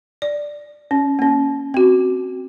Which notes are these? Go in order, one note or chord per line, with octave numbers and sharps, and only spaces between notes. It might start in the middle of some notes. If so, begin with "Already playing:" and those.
D5
C#4
A#3 C#4
C4 F#4